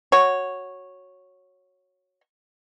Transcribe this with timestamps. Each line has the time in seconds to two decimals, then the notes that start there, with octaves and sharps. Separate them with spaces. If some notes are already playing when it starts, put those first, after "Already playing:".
0.12 F#4 C#5